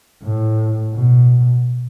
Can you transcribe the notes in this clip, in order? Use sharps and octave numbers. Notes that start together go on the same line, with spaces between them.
A2
B2